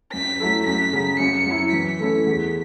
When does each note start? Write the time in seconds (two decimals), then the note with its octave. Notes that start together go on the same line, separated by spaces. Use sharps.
0.13 F#2 B6
0.40 F#3 A3 E4 A4
0.66 F#2 B6
0.93 C#3 F#3
1.20 F#2 C#7
1.46 F#3 C#4 E4
1.73 E3 B6
1.99 A3 C#4 E4 A4
2.27 E2